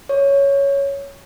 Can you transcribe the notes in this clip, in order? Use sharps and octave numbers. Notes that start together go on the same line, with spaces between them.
C#5